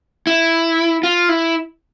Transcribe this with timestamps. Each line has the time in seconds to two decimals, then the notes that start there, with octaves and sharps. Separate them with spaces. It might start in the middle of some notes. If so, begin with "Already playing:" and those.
0.27 E4
1.03 F4
1.29 E4